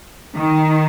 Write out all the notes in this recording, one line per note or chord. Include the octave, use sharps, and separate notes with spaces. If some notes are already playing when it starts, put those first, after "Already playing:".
D#3